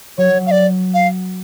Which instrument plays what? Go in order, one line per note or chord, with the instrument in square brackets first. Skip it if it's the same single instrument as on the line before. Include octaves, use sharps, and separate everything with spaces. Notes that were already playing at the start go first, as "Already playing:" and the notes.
[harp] F#3 [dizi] C#5
[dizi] F5
D5
F5